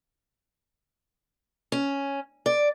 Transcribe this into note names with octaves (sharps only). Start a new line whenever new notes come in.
C#4
D5